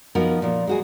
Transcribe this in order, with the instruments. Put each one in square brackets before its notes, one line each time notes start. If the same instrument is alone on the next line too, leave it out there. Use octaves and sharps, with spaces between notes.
[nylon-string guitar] F3 B3 D#4 F#4 A#4
A#2 F3
G#3 F#4 G#4